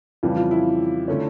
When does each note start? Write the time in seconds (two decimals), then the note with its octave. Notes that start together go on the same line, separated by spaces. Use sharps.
0.23 F2 C#3 E3 G3 F4
0.37 F4
0.51 E4
1.08 D3 A3 C#4